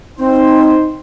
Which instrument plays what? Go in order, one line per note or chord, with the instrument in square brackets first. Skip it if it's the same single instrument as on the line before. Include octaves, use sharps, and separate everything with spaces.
[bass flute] C4 [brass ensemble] D#4 C5